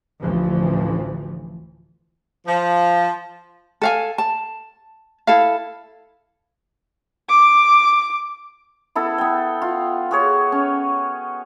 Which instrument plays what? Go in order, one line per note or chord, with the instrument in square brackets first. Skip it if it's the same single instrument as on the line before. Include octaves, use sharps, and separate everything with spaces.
[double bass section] A1 D2 E3 F3
[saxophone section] F3
[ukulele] A4 F5 G#5
A5
E4 A4 F5
[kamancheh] D6
[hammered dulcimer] B3 E4 A4
B3 G5
F4
F#4 G#4 C#5
C#4